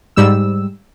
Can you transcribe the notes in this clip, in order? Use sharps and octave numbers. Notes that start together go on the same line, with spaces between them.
G#2 G3 E6